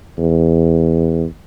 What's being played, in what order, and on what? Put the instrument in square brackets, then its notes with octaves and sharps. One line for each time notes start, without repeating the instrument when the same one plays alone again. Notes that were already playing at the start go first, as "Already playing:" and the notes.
[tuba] E2